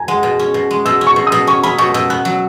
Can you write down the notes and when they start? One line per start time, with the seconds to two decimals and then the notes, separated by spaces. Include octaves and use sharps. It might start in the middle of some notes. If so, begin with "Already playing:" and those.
Already playing: G#5 A#5
0.08 G#3 F#5
0.23 B2
0.39 C#4
0.54 B2
0.71 G#3
0.85 B2 E6
1.01 C#4
1.07 C#6
1.16 B2
1.27 D#6
1.32 B2
1.47 C#4 C#6
1.63 C#4 B5
1.78 B2 C#6
1.94 B2 E6
2.10 B3 F#6
2.25 F#3